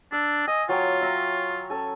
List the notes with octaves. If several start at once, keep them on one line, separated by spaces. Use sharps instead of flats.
D4 E6
D#5 G#5
F#3 F4 C#5 G5
E5 A#5 C#6
C#4 A4 G#5